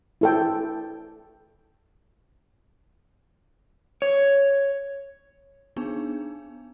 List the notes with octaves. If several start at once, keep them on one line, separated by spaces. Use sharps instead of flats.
E4 A4 G5
C#5
B3 D4 D#4 G#4